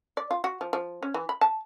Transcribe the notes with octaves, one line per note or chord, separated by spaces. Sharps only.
D5
F4
F#4
F3
F3
C#4
E3
B5
A5